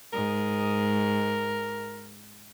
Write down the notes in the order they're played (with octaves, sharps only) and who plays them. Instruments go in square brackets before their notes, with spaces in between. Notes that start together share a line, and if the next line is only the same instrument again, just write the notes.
[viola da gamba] G#2 [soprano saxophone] A#4